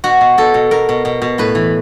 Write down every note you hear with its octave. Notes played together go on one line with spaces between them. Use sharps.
B2 F#4
B2
B2 A4
B2
B2 A#4
B2
B2
B2
A2 B4
E3